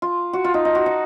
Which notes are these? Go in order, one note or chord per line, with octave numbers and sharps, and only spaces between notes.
F4
F#4
F4
D#4
D#4
F#4
D#4